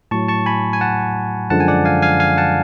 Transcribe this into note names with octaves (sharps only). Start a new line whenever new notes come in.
A2 F#3 A5 C#6
A5 C#6
G#5 B5
G#5
F#5 A5
F#2 D3 F3 G#3 F#5 A5
G#5
D5 F#5
F5 G#5
F5 G#5
F5 G#5
F#5 A5